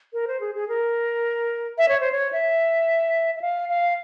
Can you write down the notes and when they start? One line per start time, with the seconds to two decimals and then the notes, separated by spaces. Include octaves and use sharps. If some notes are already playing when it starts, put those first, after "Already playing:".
0.13 A#4
0.27 C5
0.41 G#4
0.54 G#4
0.68 A#4
1.78 E5
1.89 C#5
2.00 C5
2.12 C#5
2.32 E5
3.36 E5
3.41 F5
3.69 F5